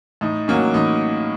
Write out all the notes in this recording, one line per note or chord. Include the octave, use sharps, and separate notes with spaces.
A2 D#4
F#3 A#3 C#4
A2 D#4